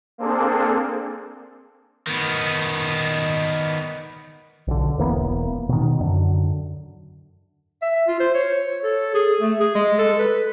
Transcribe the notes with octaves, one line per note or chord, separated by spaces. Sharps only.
A#3 C4 D4 G#4 A4
D#3 B3
B1 D3
E1 E3 A#3 B3
B2 D#3
F#2 D3
E5
F4
C5
C#5
A4
G#4
A3
G#4
G#3
A4
B4